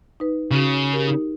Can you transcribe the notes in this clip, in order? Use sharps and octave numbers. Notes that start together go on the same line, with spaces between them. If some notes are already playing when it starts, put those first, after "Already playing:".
D#4 B4
C#3 F#4 C#6
G4 A#4
D#4